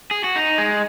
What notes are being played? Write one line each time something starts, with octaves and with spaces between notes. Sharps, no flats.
G#4
F#4
D#4
G#3